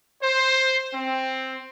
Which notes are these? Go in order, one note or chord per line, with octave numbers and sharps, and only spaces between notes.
C5
C4